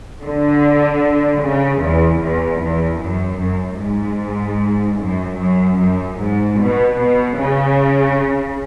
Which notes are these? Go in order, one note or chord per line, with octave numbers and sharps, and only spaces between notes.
D3
C#3
E2
E2
E2
F#2
F#2
G#2
F#2
F#2
F#2
G#2
B2
B2
C#3